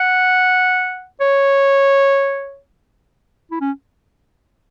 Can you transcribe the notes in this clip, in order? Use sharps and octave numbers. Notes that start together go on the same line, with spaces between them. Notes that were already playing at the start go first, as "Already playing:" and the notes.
Already playing: F#5
C#5
E4
C#4